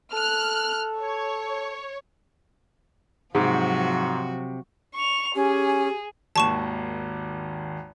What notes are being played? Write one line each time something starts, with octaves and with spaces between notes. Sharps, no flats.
A4 F6 F#6
C#5
G#2 C3 F3 F#3 F#4
C#6 F7
C#4 G4 G#4
G#1 D#2 A5 C#6 E7